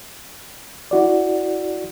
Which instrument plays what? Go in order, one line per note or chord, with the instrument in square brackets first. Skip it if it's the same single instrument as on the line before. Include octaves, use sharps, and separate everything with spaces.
[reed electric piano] E4 F#4 D5